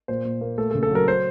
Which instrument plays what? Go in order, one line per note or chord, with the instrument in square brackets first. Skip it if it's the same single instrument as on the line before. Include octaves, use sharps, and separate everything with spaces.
[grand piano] A#2 C5
A#2
A#3
A3 A4
A4
C#3
A4
F#3 A#4
C5